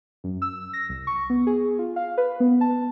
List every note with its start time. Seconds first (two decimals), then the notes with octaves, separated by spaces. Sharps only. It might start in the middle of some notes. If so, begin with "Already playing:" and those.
0.24 F#2
0.42 E6
0.73 A#6
0.89 C2
1.07 C#6
1.30 B3
1.47 G#4
1.79 F4
1.96 F5
2.18 B4
2.40 B3
2.61 A5